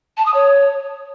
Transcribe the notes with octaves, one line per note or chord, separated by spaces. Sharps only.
A5
D#6
C#5